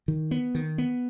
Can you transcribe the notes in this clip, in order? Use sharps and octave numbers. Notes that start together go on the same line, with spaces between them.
D#3
B3
D#3
B3